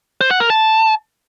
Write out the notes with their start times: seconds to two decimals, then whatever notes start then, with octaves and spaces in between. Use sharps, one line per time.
0.21 C5
0.31 F#5
0.40 A#4
0.50 A5